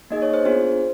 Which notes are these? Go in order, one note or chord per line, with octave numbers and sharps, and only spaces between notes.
A#3 D#4 G#4 D#5
C#5
C5
B3 D4 F4 G#4 C5